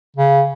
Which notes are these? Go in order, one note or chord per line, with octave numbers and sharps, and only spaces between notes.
C#3